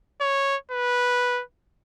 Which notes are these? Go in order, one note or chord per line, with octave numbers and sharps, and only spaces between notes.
C#5
B4